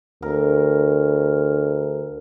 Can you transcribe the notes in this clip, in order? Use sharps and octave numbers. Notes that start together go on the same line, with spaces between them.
D2 A#4